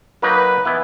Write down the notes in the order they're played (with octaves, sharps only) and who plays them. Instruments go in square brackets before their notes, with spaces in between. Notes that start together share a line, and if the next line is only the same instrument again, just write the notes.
[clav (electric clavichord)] F#3 A#3 D#4 [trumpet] B4
[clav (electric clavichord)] E3 B3 E4